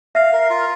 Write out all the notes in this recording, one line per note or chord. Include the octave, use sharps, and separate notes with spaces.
E5 F5
A#4
F4